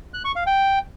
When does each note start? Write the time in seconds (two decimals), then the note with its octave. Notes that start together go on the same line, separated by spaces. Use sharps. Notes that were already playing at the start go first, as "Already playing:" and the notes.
0.14 F#6
0.25 C#6
0.36 F5
0.46 G5